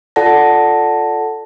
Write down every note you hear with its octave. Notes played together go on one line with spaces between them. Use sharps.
F4 A4 D5 F#5 A5 A#6